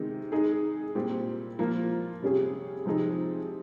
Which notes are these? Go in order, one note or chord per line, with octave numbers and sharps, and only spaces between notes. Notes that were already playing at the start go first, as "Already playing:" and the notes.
Already playing: C3 D#3 G#3 D#4
G#3 D#4 G#4
A#2 G3 C4 G4
F3 A#3 F4
C3 G3 C#4 G#4
C3 F3 C4 D#4 G#4